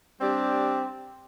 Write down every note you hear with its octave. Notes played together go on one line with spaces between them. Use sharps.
G3 C4 D4 G4